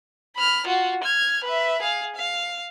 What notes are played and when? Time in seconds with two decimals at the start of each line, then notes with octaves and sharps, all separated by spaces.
0.36 B5 F6
0.66 F4 F#4
1.03 F6 G#6
1.45 B4 E5
1.82 G#4 F5
2.16 F5